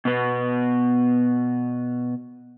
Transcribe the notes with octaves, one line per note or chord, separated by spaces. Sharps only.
B2 B3